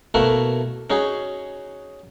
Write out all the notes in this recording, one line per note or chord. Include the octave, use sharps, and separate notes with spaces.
B2 A3 A#3 E4 F#4 A#4
C#4 D#4 F#4 G#4